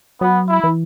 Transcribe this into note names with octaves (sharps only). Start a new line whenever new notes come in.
F#3 B3
E4
E3